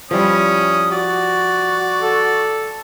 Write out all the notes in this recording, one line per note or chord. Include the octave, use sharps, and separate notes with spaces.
F3 G3 C#4 E4 D#6
F#4 D5
A4